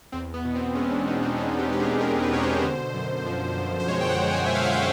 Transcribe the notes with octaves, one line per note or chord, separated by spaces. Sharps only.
E2 C4
B3
B2
C4
G#3 C#4
D4
E2 D#4
D4
B2 D#4
G4
G#3 G4
G#4
E2 A#4
B4
B2 C#5
C5
D3
F#2
F3
F#2
C5
G#3 C#5
G5
F#5
G#3
G#5
E5
F3 F5
F#5
G5